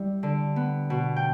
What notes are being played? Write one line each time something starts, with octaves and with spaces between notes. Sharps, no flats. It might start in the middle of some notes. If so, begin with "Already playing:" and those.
Already playing: G3 E4
D3
B3
B2
G5